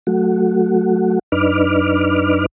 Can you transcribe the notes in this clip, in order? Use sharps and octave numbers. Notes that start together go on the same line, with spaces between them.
F#3 A3 F#4
F#2 D4 D#4 B4 D6 F6